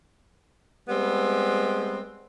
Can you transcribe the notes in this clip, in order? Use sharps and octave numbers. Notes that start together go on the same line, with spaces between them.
G3 G#3 B3 C4